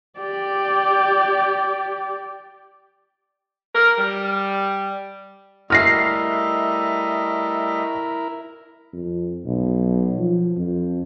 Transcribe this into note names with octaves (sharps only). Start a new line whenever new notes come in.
G4 D5
A#4
G3
G3 A3 E4 A#4 D#5 F6 A#6 C7
F2
B1
F3
F2